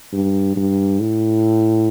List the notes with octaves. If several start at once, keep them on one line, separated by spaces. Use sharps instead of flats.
G2
G2
A2